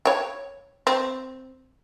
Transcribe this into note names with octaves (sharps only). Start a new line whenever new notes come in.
C#5 G5
C4